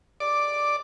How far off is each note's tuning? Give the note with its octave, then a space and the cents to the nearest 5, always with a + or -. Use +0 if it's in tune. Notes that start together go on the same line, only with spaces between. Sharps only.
D5 +0 D6 +5